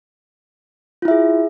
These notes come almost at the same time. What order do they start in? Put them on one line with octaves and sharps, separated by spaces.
F4 E4 E5 G#4